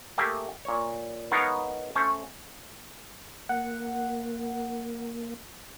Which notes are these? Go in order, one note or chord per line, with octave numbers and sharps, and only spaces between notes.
A3 A#3 G4 G#4 E5
A#2 C#5
G#3 B3 D#4 A#4 C#5 F5
A3 C#4 C5 C#5
A#3 F#5